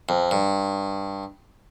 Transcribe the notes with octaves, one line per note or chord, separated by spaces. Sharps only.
F2
G2